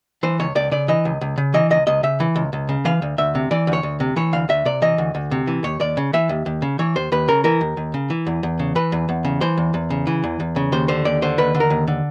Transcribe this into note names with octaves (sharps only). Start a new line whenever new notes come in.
E3 C5
C#2 C#5
C#2 D5
C#3 D5
E3 D#5
C#2
C#2
C#3
E3 D#5
C#2 D#5
C#2 D#5
C#3 E5
E3
C#2
C#2
C#3
E3 F5
D2
D2 E5
C3
E3 D5
D2
C#5
D2
C3
E3 C#5
D2 F5
D2 E5
C3 D5
E3 D#5
D2
D2
C3
E3
D#2 C#5
D#2 D5
C#3
E3 E5
D#2
D#2
C#3
E3 C#5
D#2 C5
D#2 B4
C#3 A#4
E3 A#4
D#2
D#2
C#3
E3
E2
E2
C#3
E3 B4
E2
E2
C#3
E3 C5
E2
E2
C#3
E3
E2
E2
C#3
D#2 C5
D3 C5
D#2 D5
D3 C5
D#2 B4
D3
A#4
D#2
D3